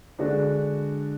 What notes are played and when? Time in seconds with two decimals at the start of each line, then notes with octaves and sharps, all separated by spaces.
0.19 D3 G#3 D4 F#4